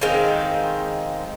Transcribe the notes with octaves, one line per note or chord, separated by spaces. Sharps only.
D#3 G#3 C4 F5